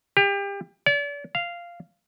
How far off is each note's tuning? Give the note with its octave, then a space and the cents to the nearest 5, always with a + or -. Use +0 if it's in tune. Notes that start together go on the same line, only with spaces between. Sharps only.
G4 +30
D5 -40
F5 -10